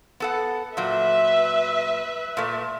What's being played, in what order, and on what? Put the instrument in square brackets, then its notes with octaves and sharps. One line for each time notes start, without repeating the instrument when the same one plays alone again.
[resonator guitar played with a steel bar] B3 A4 F#5
[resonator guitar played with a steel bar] A#2 F#3 [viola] B4 E5
[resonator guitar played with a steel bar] A#2 A3